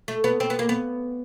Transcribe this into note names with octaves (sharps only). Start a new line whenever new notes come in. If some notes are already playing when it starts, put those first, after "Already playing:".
A3
B3
C4
B3
A#3
B3